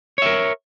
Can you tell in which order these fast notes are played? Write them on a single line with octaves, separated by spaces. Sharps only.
C#5 E5 A#4